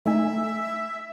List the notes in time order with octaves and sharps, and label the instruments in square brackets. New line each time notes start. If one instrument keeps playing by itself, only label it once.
[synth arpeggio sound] A3 D#4 G#5 [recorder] E5